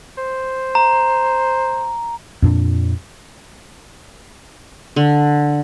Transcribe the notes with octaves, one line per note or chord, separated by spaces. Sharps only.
C5
A#5
F2 A#2 D4
D3